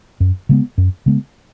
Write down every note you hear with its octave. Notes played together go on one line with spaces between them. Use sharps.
F#2
C#3 G#3 B3
F#2
C#3 G#3 B3